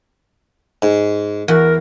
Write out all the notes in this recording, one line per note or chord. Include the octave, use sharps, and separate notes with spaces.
G#2
E2 F#4 A#4